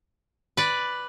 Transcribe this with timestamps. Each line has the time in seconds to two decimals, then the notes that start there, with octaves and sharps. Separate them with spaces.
0.57 B4 D5